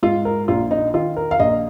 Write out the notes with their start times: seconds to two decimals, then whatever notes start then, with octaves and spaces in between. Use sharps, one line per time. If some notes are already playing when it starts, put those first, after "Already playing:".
0.03 G#2 F4
0.25 A#4
0.48 A#1 F4
0.71 D#4
0.94 D#3 F4
1.17 A#4
1.31 F5
1.40 A#1 D#5